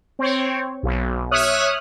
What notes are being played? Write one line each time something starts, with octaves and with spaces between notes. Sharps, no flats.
C4 C#5
B1
C#5 E5 D#6 F6 F#6